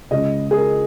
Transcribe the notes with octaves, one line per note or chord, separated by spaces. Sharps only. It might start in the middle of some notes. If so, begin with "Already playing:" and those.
C#2 C#3 G#3 C#4 D#5
G#4
A#4